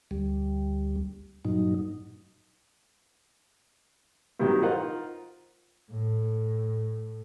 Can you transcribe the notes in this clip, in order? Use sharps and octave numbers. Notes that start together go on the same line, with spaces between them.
D2 G3
G2 A#2 F#3 D#4
G2 C3 D#3 F#3
D#4 F4 A#4 C5 D#5 F#5
A2